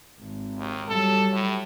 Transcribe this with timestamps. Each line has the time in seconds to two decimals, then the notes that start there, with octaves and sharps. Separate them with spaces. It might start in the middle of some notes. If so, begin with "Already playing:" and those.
0.21 G#1
0.59 D#2
0.89 F#3 G3 A4
1.33 A2